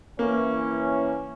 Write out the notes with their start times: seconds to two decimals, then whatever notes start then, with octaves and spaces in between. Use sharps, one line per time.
0.19 E3 A#3 C#4